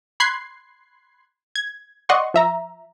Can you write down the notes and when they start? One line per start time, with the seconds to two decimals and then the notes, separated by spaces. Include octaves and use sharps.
0.20 B5 C6 F#6 G#6 C7
1.55 G#6
2.09 D5 D#5 F#5 C6 C#6
2.34 F3 E5 A#5